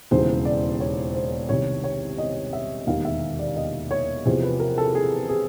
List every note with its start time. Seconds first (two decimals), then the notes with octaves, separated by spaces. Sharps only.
0.11 E1 D#2 C#3 E3 C5
0.45 D5
0.80 C#5
1.14 C5
1.49 C2 C3 D#3 C#5
1.84 C#5
2.18 D#5
2.53 E5
2.87 E1 D#2 D#3 F5
3.05 E5
3.39 D5
3.56 D#5
3.91 C#5
4.26 E2 C3 F3 C5
4.43 B4
4.60 A#4
4.78 A4
4.95 G#4
5.29 G#4